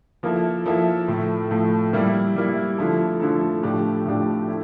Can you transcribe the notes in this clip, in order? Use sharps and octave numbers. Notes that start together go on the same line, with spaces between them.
F3 A#3 E4 A4 E5
F3 A#3 E4 A4 E5
A2 F3 A3
A2 F3 A3
G3 A#3 E4
G3 A#3 E4
D3 F3 A3 E4 A4
D3 F3 A3 E4 A4
A2 F3 A3 D4 G4
A2 F3 A3 D4 G4
A3 E4